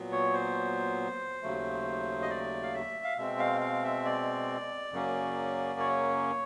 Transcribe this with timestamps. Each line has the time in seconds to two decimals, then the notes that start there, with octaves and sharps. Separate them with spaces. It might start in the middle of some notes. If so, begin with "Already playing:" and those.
Already playing: A#2 F#3 B3
0.12 C#5
0.34 C5
1.43 D#2 C#3 F#3 A3
2.22 D#5
2.30 D5
2.63 F5
2.74 E5
3.04 F5
3.18 B2 G#3 C4 E5
3.39 F5
3.61 F5
3.84 E5
4.05 D5
4.93 F#2 C#3 F#3 A#3 C#4
5.80 C#5